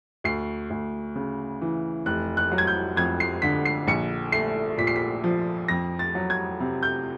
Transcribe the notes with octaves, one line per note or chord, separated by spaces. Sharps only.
D2 C7
D2
C#3
E3
F1 F#6
F#6
F#3
G#6
G6
F2 G#6
C7
D3 B6
C7
A#1 C#7
A3 C7
A#2 B6
C7
B6
F3
F2 A#6
A6
F#3
G#6
C3
G6